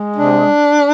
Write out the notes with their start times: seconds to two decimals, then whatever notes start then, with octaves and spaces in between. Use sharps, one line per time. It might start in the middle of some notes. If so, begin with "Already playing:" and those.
Already playing: G#3
0.15 C3 D4